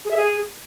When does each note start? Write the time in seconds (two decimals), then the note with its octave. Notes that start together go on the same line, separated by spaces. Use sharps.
0.05 G#4
0.11 E5
0.17 G#4